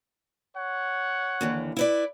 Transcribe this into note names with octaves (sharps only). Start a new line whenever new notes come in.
C#5 F#5
D#2 D3 E3
E4 B4 D5